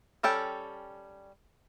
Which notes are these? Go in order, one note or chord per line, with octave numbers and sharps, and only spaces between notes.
G3 C#4 A4 G5